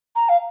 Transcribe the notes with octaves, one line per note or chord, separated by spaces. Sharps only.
A#5
F5